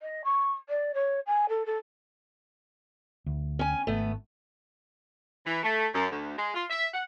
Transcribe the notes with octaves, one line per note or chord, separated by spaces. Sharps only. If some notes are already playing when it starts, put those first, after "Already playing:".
D#5
C#6
D5
C#5
G#5
A4
A4
D2
C#4 G#5
G#1 A3 B3
E3
A3
F#2
D2
G#3
F4
E5
F#5